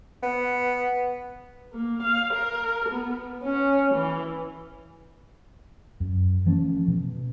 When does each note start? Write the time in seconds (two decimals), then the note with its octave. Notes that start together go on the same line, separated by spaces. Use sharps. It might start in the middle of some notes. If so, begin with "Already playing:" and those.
0.22 B3
1.73 A#3
2.03 F5
2.33 A#4
2.89 B3
3.44 C#4
3.95 E3
6.00 F#2
6.46 E3 F3 A3 C#4
6.88 B2